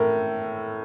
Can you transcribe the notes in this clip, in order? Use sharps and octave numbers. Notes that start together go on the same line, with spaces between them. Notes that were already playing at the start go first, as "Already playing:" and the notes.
Already playing: A2 A4 A#4